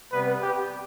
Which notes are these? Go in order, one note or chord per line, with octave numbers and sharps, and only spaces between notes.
C3 G3 B3 B4
G4